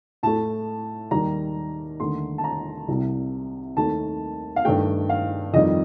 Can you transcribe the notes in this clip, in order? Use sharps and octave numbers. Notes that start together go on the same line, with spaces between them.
A2 A3 A5
D#2 D#3 G3 A#5
D#2 D3 A3 C6
A5
A#5
C2 C3 G3
D#2 D#3 A3 A5
F5
G2 D#3 A3 G5
F5
F2 D#3 G3 D#5